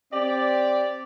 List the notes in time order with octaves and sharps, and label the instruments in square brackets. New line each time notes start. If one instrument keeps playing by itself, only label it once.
[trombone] C4 [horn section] G4 D5